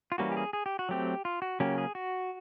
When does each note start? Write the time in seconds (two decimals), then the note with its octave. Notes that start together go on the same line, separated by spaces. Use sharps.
0.12 F4
0.18 E3 G3 A#3 C#4 F#4
0.32 G4
0.37 G#4
0.53 G#4
0.66 G4
0.79 F#4
0.89 F#3 A3 C4 G4
1.25 F4
1.42 F#4
1.60 C#3 F#3 A#3 C#4 G4
1.78 G#4
1.95 F#4